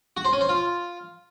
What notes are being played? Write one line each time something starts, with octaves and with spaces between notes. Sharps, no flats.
F#4
C5
C#4
C5
F4